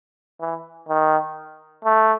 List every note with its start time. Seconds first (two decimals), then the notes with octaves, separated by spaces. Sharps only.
0.41 E3
0.89 D#3
1.85 A3